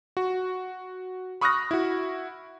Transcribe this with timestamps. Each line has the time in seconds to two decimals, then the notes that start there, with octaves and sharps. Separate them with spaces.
0.17 F#4
1.41 B5 C#6 D#6 F6 F#6 A#6
1.71 E4 F#4